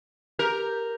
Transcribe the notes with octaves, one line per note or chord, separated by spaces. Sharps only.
G4 A#4 G6